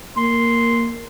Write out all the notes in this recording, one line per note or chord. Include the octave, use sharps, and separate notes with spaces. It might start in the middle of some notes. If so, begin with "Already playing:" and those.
A#3 C6